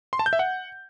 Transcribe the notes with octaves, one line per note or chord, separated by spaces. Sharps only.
C6
A5
G6
E5
F#5